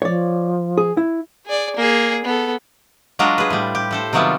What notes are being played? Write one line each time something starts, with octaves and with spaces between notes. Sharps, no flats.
F3 C#5 D5
G#4
E4
G#4 D5
A#3 G#4
B3 A4
F#3 G#3 D4 F4 F#4 A#4
G#4 B4
A2 G3
G4
A2 A4 C5
C3 D#3 F#3 G3 B3 F4